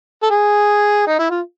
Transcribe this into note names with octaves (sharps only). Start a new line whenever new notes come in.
A4
G#4
D#4
E4
F4